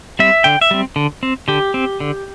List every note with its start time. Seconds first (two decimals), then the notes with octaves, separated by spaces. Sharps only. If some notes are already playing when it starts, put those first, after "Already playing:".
0.19 G3 C4 E5
0.44 D3 G5
0.61 E5
0.71 G3 C4
0.96 D3
1.23 C4
1.48 D3 G4
1.74 C4
2.00 D3